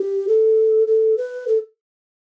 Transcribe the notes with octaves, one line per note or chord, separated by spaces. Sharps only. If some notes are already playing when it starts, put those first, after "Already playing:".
Already playing: G4
A4
A4
B4
A4